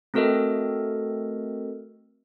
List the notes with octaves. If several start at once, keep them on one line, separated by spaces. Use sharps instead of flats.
A3 C4 F#4 A4 A#4 D#5